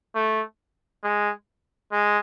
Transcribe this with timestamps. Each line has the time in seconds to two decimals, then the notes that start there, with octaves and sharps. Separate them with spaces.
0.15 A3
1.04 G#3
1.92 G#3